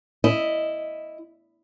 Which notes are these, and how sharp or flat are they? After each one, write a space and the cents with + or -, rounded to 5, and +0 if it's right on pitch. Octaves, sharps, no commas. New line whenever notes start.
E4 +0 D#5 +0